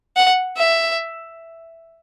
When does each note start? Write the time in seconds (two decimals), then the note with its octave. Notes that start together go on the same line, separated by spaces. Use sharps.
0.17 F#5
0.57 E5